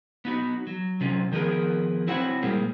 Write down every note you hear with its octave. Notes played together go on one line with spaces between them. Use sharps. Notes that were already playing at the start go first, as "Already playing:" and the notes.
B3 D#4 F#4
F#3
C3 F#3 C#4 F4
D#3 F3 B3 G#4 A#4
C4 E4 F#4 C#5 F#5
A#2 G3 G#3 A#3